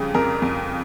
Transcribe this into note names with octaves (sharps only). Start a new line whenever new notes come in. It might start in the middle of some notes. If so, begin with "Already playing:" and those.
Already playing: F2 C#3 G3
F2 A#4
F2